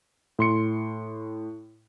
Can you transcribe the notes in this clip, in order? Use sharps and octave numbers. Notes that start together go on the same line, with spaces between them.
A2 C6 C#7